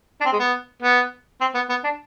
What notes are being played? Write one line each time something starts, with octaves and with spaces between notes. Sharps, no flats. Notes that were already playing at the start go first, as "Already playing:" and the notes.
D4
C4
G#3
B3
B3
C4
B3
B3
D4